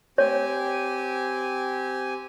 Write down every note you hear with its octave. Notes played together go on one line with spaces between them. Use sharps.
C4 G4 C#5 G#5